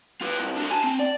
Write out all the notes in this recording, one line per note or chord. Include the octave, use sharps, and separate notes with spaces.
F4 B4
C2
D4 F#4
G#5 A5
C4
D5